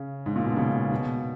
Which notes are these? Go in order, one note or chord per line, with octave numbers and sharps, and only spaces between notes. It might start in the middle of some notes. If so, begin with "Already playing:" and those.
Already playing: C#3
G#2
A#2
B2
C#3
B2